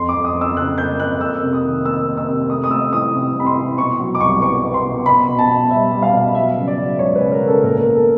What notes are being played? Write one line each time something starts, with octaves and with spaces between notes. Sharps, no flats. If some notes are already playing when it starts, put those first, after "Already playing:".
Already playing: F2 C6
D6
F2
D#6
F2
E6
C#3 F#6
A#3 G6
F2 F#6
A#3 E6
C3
D#6
D#3
A#3 E6
A#3
E6
C3
A3 D#6
D#6
A3 E6
E3 D#6
C3
C3 B5
C6
E3
B2 C#6
F#3
D6
C2 C#6
B3 C#6
B3
C6
B2
B2 B5
B2
A5
B2
G3 E5
G3
F5
B2
F#3 E5
C#3
D5
F#3
C#2 C#5
B4
C#3
A#4
C#3
A4
A#2 A#4
B3 A#4
A4